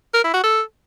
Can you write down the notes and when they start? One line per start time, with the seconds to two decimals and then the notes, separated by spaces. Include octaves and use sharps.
0.14 A#4
0.24 E4
0.34 F#4
0.43 A4